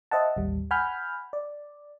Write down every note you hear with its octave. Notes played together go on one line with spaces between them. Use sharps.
C5 D#5 E5 F#5 A5
A1 D#2 G3
F#5 G#5 B5 F6 G6
D5